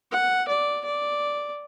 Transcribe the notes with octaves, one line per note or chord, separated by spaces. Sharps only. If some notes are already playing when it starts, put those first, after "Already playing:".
F#5
D5
D5